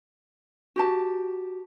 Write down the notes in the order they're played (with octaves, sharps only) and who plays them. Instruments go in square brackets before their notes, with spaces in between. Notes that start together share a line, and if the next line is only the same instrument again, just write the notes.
[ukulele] F#4 G4 A5